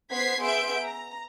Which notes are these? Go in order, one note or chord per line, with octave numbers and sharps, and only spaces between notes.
B3 C5 G#6 B6 C7
B3 G#4 E5 C6 G6 D7
A#5